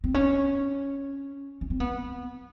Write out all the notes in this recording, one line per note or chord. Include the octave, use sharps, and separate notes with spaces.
C4
C#4
C#4
C4
B3